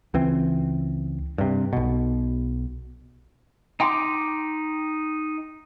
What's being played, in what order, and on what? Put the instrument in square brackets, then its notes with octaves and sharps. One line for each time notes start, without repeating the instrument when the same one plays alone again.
[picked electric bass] C#2 E3 C4
G2 C3
B1 B2
[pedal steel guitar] D#4 G5 C6 D6